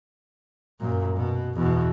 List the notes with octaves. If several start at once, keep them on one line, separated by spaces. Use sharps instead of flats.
F#2 A#2
B2
E2 B2